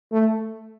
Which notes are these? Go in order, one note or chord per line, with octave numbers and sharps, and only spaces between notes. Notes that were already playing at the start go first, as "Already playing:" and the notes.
A3